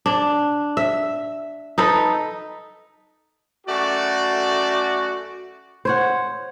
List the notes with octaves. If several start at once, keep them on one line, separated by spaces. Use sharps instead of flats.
D4
E5
D#4 A4 B4
F#2 A3 F#4 D5
C5 C#5 F#5